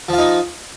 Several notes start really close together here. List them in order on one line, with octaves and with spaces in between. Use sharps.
F3 F4 D#4